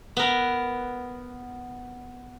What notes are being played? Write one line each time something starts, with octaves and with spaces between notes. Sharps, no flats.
B3 A#4